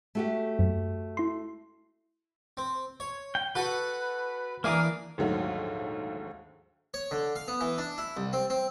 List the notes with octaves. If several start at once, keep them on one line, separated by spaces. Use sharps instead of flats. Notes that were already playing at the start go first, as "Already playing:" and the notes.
A3 F#4 G4
F#2
E4 C6
C4
C#5
G5
F#4 A4 B4 F#5
E3 A#3 D4 G#4 A#4
A#1 D#2 G#2 D3 F#3 A3
C#5
D3
F5
B3
E3
D4
E4
C2
C4
C4